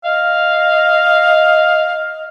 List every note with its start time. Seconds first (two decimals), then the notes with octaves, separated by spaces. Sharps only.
0.04 D#5 F5